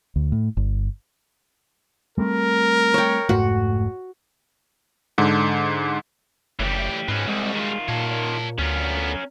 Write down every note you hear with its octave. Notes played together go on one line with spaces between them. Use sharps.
D2
A2
G1
G3 A3 C4 A#4
C#5 G5
F1 G#2 A3 F#4
G#2 D3
F#1 A2 E3 G3 G4
G#2 C4 C#4 F#4 B4
C2 G3 G#3 F#4
D#3 F4
A#2 C#5 A5
D2 B3 C#4 F4 A#4